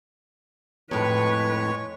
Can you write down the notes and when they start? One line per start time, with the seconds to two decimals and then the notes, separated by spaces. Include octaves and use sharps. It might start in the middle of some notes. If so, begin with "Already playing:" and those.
0.91 F2 A2 G#3 B4 C#5 C#6